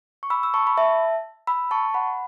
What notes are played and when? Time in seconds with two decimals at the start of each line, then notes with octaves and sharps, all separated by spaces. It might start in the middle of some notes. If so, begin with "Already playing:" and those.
0.23 C#6
0.30 B5 E6
0.43 E6
0.54 A5 C#6
0.67 B5
0.78 E5 A5
1.47 B5 E6
1.71 A5 C#6
1.94 F#5 B5